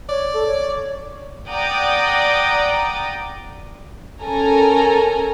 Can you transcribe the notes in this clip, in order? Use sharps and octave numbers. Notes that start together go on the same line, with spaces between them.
C#5 D5
A4
C#5
D5 F#5 G5 A#5 D6 D#6
C#4 A4 A#4 G#5 A#5